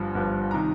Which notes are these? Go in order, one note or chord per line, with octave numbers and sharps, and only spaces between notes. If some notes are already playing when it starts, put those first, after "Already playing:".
Already playing: G1 G2 F3
G1 G2 F3
C3 D#3 A#5